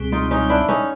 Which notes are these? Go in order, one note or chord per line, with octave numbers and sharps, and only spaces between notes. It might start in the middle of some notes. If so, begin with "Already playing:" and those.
Already playing: C#2 B2 G3 C4 G#4
D#4 F4
C#4 D#4
D4 E4
C#4 D#4